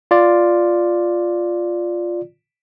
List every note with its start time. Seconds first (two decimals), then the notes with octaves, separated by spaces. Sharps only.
0.11 F4 D5